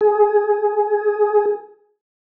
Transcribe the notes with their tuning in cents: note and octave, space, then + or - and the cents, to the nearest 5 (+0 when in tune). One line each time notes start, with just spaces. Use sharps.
G#4 +15